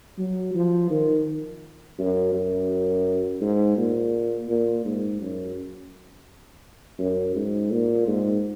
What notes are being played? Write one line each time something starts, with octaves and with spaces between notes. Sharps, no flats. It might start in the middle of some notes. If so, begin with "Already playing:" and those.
F#3
F3
D#3
F#2
F#2
G#2
A#2
A#2
G#2
F#2
F#2
G#2
A#2
G#2